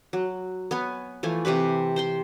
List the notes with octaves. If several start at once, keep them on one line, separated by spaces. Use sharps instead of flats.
F#3
B3 C#5 G#5
E3 F3 A3 G#5
C3 E3 G4 B4
C5 G5 C6